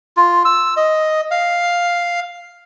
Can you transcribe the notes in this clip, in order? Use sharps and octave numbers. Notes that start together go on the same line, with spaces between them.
F4
E6
D#5
F5